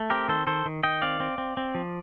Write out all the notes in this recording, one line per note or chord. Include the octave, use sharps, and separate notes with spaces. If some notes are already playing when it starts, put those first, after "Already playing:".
Already playing: A3
C4 G4 A#4
D#3 A4 C5
D#3 A4 C5
D#3
D#3 D#5 G5
C4 D5 F5
C4
C4
C4
F3